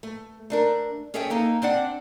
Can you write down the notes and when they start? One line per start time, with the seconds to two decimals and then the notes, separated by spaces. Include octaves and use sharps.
0.03 A3
0.50 A3 D4 A#4
1.14 C#4 G#4 A4 C#5 E5 G5
1.30 A#3 D#4 A4
1.62 C4 D4 D5 F#5